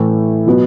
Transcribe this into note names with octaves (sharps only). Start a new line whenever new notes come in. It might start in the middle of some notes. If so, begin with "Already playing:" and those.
Already playing: A2 E3 A3
B2 F#3 B3